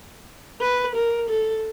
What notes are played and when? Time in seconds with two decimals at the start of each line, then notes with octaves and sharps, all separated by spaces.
0.61 B4
0.95 A#4
1.30 A4